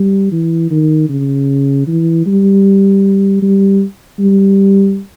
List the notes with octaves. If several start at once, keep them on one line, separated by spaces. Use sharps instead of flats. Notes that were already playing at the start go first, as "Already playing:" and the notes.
Already playing: G3
E3
D#3
C#3
E3
G3
G3
G3